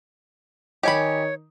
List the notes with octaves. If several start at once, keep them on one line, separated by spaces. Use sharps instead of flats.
D#3 D#4 G4 C#5 G#5 B5